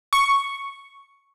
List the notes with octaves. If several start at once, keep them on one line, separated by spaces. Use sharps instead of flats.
C#6